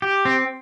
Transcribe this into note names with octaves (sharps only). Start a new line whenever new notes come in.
G4
C4